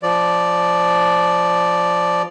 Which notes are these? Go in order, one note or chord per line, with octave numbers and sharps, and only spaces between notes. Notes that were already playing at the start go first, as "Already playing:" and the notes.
F3 D5